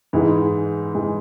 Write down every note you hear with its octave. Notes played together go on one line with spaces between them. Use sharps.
G#2 E3 G#3
E3 G#3